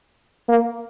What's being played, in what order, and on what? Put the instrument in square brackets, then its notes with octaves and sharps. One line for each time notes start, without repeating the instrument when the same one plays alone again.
[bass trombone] A#3